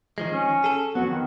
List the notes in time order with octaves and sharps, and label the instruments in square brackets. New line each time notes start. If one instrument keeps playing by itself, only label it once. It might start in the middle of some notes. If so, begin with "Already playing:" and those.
[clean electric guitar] D#3 F3 G#3
[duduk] C#4
[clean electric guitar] G#4 A4
[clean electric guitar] F2 F#3 [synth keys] B3 [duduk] F#4
[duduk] D#3